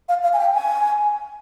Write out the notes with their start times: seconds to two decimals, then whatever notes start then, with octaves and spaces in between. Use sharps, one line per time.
0.09 F5
0.23 F5
0.33 G#5
0.39 G5
0.54 G#5